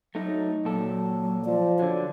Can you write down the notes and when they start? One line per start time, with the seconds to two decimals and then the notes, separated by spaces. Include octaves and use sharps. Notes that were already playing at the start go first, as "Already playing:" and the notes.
0.15 F#3 A3 D#4
0.65 A#2 F#3 A4
1.45 F3 D5
1.79 D3 F#3 D5